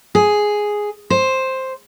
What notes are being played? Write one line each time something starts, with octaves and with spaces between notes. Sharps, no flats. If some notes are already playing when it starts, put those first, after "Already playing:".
G#4
C5